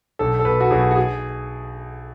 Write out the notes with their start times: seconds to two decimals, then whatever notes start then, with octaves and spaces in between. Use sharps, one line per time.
0.19 B1 A4
0.39 A4
0.45 B2 B4
0.60 F#4
0.70 B1 G#4
0.91 F#4
0.96 G#4